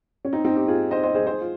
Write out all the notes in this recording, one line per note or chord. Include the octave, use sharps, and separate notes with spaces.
C#4
C4 D#4
C4 D#4
D#4 G4
F4 G#4
C5 D#5
C5 D#5
G#4 C5
G#4 C5
F4